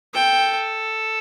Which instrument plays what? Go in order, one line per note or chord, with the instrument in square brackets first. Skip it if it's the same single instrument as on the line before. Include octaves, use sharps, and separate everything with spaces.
[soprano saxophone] A4 [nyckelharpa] G5